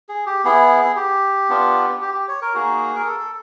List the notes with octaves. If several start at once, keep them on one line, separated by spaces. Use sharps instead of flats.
G#4
G4
B3 E4 G#4
G4
B3 D4 F4
G4
G4
C#5
A#4
A#3 D#4 F#4 G#4
A#4
A4
A4